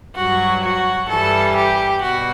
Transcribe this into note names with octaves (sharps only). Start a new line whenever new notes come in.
G2 F#3 F#4
F#4
G2 E3 G3 A4
G4
B2 G3 F#4